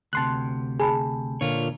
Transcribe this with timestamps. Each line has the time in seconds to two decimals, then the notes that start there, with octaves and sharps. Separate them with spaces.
0.13 D2 C3 A5 C6 F#6
0.80 G#4 G#5 A5 B5
1.41 A#2 D3 F4 C#5